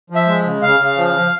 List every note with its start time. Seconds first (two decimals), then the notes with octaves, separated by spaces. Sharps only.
0.10 F3
0.15 E5
0.27 G#3
0.45 C#3
0.62 C#3 F5
0.80 C#3
0.97 F3
1.14 F3